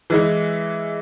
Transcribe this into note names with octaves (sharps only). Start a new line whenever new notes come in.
E3 G#3 E4